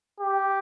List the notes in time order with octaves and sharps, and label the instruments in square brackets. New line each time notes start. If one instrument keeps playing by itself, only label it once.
[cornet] G4